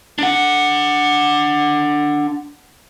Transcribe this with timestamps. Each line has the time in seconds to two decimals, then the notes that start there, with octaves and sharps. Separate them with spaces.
0.19 D4 F#5